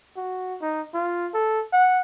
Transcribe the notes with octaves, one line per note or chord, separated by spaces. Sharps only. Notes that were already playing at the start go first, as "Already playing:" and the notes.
F#4
D#4
F4
A4
F#5